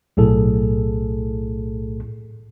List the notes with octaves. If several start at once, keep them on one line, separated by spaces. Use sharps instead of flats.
B1 A2 G#4 A4